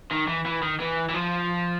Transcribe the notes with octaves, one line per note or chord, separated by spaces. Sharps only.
D#3
E3
E3
D#3
E3
E3
F3